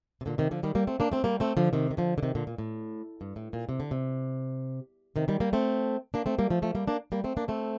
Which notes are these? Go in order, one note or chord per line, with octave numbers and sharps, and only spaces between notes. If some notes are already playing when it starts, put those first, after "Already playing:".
C3
A#2 D3
C3 D#3
D3 F3
D#3 G3
G3 A#3
A3 C4
A#3 D4
A3 C4
G3 A#3
A3 C4
D3 F3
C3 D#3
D#3
D3 F3
D3
C3 D#3
A#2 D3
A#2
A2
G2
A2
A#2
C3
D3
C3
C3 D#3
D#3 G3
G3 A#3
A3 C4
A#3 D4
A3 C4
G3 A#3
F3 A3
F3 A3
G3 A#3
A#3 D4
G3 A#3
A3 C4
A#3 D4
A3 C4